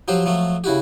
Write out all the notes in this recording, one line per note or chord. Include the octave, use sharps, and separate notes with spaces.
F3 F#3 G4 C5
F3 F#3 A3
C#3 E4 F#4 G4